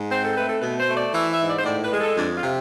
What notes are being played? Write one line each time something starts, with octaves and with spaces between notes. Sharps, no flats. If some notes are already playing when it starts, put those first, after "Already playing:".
Already playing: G#2
C4 C5
A4
A3 B4
A4
B2 B4
C5
A3
D5
E3 E5
E5
G#2
D5
C5
A2 D5
B4
G#3 G#4
A4
F2 D4
F4
C3